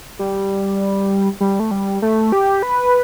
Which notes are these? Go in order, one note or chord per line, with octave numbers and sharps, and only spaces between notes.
G3
G3
A3
G3
A3
G4
B4